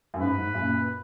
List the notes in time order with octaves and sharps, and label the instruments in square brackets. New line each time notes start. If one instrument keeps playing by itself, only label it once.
[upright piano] F#2
[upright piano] G#2 [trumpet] B4
[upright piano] G#2
F#2 A#2